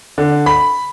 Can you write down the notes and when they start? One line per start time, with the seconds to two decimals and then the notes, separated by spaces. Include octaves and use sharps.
0.18 D3
0.46 B5